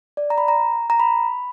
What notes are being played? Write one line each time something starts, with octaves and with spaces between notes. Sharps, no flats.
D5
A#5
B5
A#5
A#5
B5